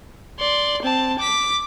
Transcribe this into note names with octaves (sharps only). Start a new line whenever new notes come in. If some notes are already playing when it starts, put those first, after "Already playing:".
D5 C6
C4 A5
D6 B6